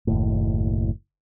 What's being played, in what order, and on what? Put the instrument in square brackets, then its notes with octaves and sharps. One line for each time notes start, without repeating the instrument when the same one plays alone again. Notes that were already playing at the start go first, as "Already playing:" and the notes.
[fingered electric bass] F#1 D#2 A2